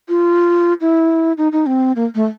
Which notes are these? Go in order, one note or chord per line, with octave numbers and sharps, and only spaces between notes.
F4
E4
D#4
D#4
C4
A#3
A3